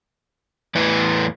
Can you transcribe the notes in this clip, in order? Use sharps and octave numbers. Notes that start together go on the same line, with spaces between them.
E2 A2 E4 B4